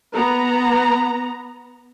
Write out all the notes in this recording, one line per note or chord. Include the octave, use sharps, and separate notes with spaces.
B3 A#5